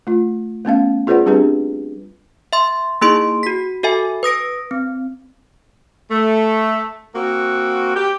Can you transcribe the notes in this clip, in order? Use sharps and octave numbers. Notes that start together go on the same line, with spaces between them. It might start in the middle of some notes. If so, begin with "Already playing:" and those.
A3 F4
A3 B3 C#4 F5
F4 G#4 B4 C5 D5 F#5
G3 C4 D4 G4 G#4 B4
E5 C6
A#3 D#4 E4 G#4 C6 D7
F#4 B6
F#4 A4 E5 G#5
B4 D#6 A#6 D7
C4
A3
A#3 C4 F#4
G4